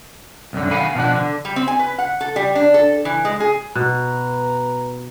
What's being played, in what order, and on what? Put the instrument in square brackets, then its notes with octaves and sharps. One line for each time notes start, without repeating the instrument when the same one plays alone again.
[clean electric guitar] C2 F#2 D3
D#3 F5 F#5 G#5 B5
B2 F3 D4 F#5
D3
[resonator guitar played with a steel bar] G3
C4
G#5
B4
F#5
A4
G3
D4
A4
E3
G#3
G#4
[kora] B2 [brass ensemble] B4 A#5 [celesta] F#6